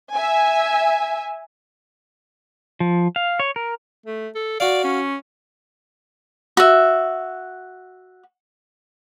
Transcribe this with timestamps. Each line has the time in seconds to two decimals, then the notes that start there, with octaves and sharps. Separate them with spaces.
0.14 E5 G#5
2.80 F3
3.16 F5
3.40 C#5
3.56 A#4
4.06 A3
4.35 A4
4.60 F#4 D5 F5
4.84 C#4
6.57 F#4 E5